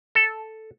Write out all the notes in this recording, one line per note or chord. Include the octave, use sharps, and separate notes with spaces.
A4